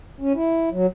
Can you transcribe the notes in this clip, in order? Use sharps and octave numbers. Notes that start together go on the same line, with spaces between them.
C#4
E4
F#3